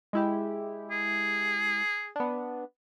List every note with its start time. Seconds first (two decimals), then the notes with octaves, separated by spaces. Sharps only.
0.13 G#3 E4 G4
0.91 G#4
2.16 B3 D4